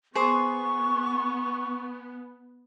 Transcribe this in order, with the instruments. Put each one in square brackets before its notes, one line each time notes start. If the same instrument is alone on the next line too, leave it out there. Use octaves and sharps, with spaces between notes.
[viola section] B3 [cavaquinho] G#4 C5 D6 [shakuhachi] C#6